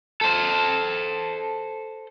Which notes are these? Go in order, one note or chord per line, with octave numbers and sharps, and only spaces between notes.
A4 C5